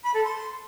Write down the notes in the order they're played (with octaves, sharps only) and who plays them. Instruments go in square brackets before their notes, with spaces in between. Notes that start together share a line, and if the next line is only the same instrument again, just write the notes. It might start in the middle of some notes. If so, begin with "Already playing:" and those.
[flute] B5
A4
C6